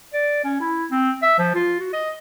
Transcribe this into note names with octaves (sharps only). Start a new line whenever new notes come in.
D5
C#4
E4
C4
E5
F3
F4
F#4
D#5